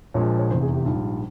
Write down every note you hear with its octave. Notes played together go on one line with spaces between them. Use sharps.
A#1 A#2 F3 G#3 C#5
C#5
F1 E2 C3 C5
G#4
G4
A#1 G#2 G3 F4